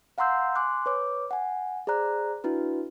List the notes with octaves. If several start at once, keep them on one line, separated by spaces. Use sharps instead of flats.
F5 F#5 A#5 C6 E6 G6
G#5 C6 D6 F#6
B4 C#5 D6
F#5 G#5
G#4 C5 D5 A#5 F#6
D4 E4 F#4 B4